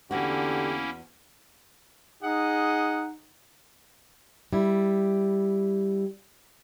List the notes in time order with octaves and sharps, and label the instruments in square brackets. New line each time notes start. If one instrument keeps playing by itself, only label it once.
[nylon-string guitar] E2 F#4 [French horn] D3 [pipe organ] A#3 C#4 E4 [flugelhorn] G4
[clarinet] D#4 [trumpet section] G#4 D#5 F#5
[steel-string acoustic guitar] G3 E4